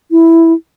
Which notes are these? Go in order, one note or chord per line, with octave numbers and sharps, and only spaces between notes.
E4